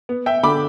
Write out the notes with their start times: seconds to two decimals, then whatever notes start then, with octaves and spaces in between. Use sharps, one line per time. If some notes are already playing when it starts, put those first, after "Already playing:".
0.09 B3
0.26 E5 G5
0.43 D3 B5 D6